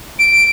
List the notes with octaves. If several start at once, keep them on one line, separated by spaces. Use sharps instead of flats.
D7